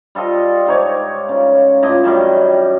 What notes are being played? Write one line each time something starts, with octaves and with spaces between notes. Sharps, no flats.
G3 F4 A4 D#5
G#2 D#4 C#5 D6
C#3
A2 F4 D#5 D6
F#2 D#3 G3